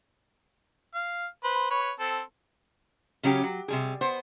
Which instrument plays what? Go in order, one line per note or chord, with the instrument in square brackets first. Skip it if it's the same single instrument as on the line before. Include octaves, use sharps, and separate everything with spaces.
[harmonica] F5
B4 C5
B4 C#5
C4 A4
[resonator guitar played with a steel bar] C#3 F#3 C#4 G4
F#3
C3 G3 G#4
B3 C5